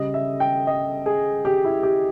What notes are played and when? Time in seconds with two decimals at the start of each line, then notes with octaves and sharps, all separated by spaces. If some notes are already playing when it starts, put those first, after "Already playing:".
Already playing: C#3 G3 D#5
0.14 E5
0.40 G5
0.67 D#5
1.06 G#4
1.45 G4
1.65 E4
1.83 G4